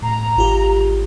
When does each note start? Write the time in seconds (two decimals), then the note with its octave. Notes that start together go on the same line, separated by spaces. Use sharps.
0.02 A2 A#5
0.37 G#1 F4 G4